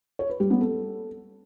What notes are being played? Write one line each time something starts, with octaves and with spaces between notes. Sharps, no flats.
C#5
B4
G3
B3
A4